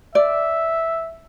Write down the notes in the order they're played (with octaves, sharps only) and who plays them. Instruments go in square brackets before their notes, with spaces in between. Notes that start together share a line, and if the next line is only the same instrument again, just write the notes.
[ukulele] D5 [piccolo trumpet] E5